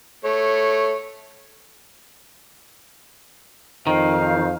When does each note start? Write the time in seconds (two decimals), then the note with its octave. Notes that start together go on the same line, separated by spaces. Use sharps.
0.25 A3 C#5
3.87 F2 D#3 D#4 C5 F5